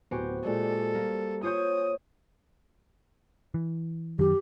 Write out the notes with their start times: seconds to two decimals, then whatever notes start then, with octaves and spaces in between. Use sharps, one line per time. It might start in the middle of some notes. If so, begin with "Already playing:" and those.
0.11 D1 B3 F#4 G4 C5 G#5
0.44 A#2 G#3 A4 D5
0.95 G3 A#3
1.43 F4 G#4 C5 C#5 D#6 G6
3.54 E3
4.19 F#2 D#3 F#3 G4